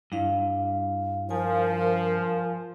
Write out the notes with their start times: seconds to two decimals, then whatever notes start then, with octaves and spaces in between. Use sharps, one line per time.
0.12 G2 E4 F5
1.31 F3 A#4 G#5